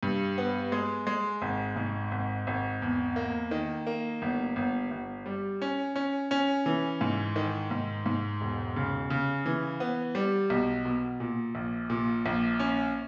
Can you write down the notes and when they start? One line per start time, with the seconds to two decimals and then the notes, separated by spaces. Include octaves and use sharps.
0.03 G2
0.38 B3
0.72 G#3
1.07 G#3
1.42 G#1
1.76 G#2
2.12 G#1
2.47 G#1
2.82 E2
3.16 A#3
3.51 D#3
3.87 A#3
4.22 G1
4.56 G1
4.91 G1
5.26 G3
5.62 C#4
5.96 C#4
6.31 C#4
6.66 E3
7.01 G#2
7.36 D#3
7.71 G#2
8.06 G#2
8.41 E1
8.76 C#3
9.10 C#3
9.46 E3
9.80 B3
10.15 G3
10.50 B1
10.85 B2
11.20 A#2
11.55 A#1
11.90 A#2
12.26 A#1
12.60 C#4